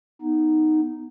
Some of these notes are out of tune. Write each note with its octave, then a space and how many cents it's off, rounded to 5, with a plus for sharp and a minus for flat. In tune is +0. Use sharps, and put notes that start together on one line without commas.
B3 +0 D#4 +0